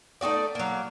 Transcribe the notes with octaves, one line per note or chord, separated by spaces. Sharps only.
A3 D#4 F#4 D5
F#3 A#3